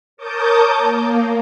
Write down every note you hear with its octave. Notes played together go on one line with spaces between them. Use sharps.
A#4 C#5 A5 D6 D#6 G6
A#3